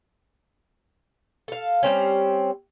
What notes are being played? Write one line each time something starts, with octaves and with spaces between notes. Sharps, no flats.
A4 F5
G3 G#3 C4 C#4